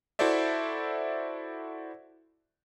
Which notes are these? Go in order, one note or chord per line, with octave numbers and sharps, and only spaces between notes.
E4 F#4 A4 C5 D5 E5